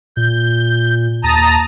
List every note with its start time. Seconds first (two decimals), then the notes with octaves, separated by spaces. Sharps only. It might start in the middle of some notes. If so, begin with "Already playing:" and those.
0.17 A#2 G6
1.24 D#2 A5 A#5 D#6